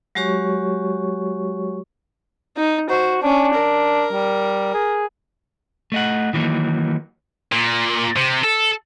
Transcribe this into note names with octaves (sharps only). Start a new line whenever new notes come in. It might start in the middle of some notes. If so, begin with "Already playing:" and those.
F#3 G#3 F#4 G4 C#5 C#6
D#4
F#4 C5
C#4 D4
A#4
G3
G#4
A3 D#5 F#5
D#3 E3 F#3 A#3 D#4
A#2
C3
A4